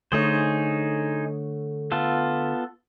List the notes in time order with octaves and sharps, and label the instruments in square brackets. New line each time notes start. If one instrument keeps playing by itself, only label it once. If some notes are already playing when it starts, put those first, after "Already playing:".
[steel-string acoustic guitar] D3 A3 C#5 [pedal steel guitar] D#4 G#4 C5
[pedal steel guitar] B3 F4 A4